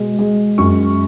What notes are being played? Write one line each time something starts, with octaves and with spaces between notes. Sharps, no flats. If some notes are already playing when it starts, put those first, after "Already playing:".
Already playing: B2 G#3
G#3
F#2 C#6